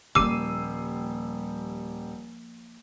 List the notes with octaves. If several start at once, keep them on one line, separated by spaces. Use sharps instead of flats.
D#1 F3 G3 A#3 D6 E6 C7 D#7